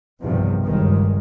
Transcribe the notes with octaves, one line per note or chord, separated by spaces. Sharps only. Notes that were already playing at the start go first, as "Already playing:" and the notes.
B1 E2 G2 C3 D#3 F3
G1 C#2 F#2 D#3 G#3